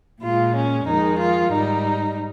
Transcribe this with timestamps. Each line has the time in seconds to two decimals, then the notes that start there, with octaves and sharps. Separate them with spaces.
0.22 A#2 G#3 F4
0.54 C#4
0.86 F2 D#3 G#3 D#4
1.18 F4
1.50 G#2 G3 D#4